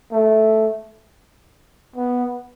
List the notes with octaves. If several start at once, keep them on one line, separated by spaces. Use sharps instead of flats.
A3
B3